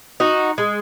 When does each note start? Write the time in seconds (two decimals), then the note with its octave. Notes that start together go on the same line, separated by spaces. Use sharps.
0.20 D#4 F#4
0.58 G#3